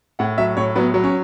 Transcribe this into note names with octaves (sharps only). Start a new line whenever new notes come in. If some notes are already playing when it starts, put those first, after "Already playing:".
A2 F#5
F#3 E5
A2 C#5
F#3 B3
F#3
C#4